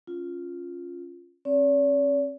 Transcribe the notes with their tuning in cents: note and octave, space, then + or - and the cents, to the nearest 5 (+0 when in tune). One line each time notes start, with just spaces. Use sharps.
C#4 +0 F4 +0
C#4 -45 D5 -45